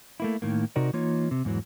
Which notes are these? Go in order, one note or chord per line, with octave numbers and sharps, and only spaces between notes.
A3 A#3 E4
A2 D#3 A#3
C3 D#4 F#4 A#4 D5
E3 A#3 D#4 F4 C#5
C3
E2 G#2 E3 F#3